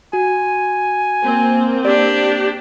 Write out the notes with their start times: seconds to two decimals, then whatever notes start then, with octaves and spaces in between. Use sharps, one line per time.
0.13 F#4 G#5
1.23 A#3 C4
1.85 D4 G4 D5